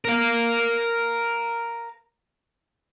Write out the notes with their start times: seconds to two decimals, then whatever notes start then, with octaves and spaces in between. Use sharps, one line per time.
0.05 A#4 F5